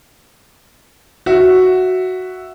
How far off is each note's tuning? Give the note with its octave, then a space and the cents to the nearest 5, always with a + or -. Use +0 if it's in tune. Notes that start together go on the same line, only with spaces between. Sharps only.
F#4 +0 E5 +0